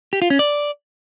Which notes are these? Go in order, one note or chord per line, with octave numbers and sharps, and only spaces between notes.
G4
F4
C#4
D5